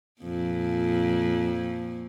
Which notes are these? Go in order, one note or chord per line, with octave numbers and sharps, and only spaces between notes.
F2 A#2